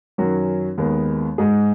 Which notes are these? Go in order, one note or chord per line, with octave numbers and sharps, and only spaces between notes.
F#2 D#3 F#3 C#4 F#4
D#2 D#3 G#3 B3
G#2 G#3 D#4 G#4